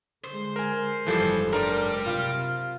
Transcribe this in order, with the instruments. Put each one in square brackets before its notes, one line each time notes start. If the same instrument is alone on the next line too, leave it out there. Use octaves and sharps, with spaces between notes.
[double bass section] D3 G#3 [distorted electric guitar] C5
[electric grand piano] A#4 G#5
[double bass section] F#1 G#2 [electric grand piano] E3 F3 G3 [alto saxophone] A4
[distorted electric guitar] G3 [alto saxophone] D4 [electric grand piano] A#4 A#5 C6
[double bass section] C3 [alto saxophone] F4